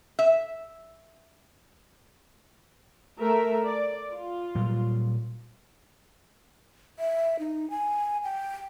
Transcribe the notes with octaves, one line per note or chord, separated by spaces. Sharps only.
E5
A3 A#4 E5
D5
F4
A#2 F#3 G3
E5
D#4
G#5
G5